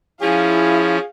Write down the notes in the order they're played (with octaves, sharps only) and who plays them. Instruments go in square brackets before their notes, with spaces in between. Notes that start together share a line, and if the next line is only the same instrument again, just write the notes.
[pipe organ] F3 C#4 [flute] E4 [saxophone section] G#4 [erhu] F5